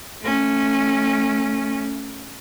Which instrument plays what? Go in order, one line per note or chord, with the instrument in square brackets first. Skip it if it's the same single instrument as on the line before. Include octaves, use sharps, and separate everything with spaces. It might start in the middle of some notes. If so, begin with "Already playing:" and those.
[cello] A3 C#4